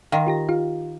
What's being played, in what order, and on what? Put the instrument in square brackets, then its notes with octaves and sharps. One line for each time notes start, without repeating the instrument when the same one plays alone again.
[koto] D#3 [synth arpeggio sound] F5 A#5 C6
[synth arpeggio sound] F4 G4 A#6
F4 G4 F5